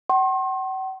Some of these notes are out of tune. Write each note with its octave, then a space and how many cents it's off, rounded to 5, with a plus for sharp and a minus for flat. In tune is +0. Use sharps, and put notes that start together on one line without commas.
F#5 +45 C6 +40